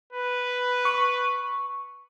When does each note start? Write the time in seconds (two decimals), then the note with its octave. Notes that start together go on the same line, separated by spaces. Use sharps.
0.13 B4
0.85 C#6